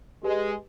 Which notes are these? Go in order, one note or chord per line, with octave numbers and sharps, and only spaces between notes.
G#3 G4 B4 D#5